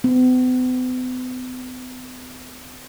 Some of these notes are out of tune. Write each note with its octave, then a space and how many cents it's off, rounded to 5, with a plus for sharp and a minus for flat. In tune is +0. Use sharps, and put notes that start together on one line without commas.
B3 +45